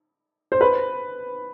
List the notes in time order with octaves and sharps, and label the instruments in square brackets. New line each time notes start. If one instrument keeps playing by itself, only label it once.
[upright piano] C5
B4